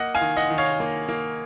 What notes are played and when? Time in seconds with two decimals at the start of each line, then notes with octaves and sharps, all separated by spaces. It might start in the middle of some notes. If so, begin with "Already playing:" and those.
Already playing: A#3 D#5 F#5
0.15 F5 G#5
0.21 D#3
0.37 D#5 F#5
0.50 D#3
0.58 C#5 F5
0.80 A#3
1.09 A#3